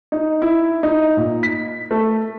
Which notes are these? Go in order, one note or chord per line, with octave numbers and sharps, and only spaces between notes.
D#4
E4
D#4
A#2
B6
A3